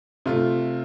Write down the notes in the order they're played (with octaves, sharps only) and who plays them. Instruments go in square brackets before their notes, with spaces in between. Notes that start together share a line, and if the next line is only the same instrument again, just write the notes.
[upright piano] C3 A3 F4